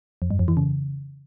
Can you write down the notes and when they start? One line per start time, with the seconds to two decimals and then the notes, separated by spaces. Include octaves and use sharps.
0.22 F2
0.31 G2
0.39 F2
0.48 E3
0.57 C#3